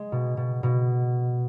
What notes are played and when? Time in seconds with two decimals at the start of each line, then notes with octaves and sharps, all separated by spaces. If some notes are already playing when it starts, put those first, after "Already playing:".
Already playing: G#3
0.12 B2
0.37 B2
0.63 B2